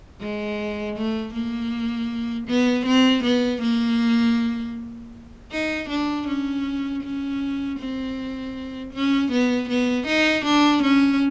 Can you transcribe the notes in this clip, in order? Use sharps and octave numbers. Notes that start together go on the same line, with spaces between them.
G#3
A3
A#3
B3
C4
B3
A#3
D#4
D4
C#4
C#4
C4
C#4
B3
B3
D#4
D4
C#4